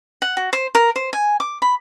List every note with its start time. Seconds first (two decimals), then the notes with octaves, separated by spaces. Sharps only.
0.22 F#5
0.37 F#4
0.53 C5
0.75 A#4
0.96 C5
1.13 G#5
1.40 D6
1.62 B5